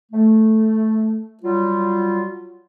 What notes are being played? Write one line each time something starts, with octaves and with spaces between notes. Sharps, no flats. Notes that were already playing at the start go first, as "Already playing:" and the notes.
A3
F#3 G3 F4